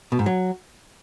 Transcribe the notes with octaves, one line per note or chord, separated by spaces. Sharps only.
B2
G#2
F#3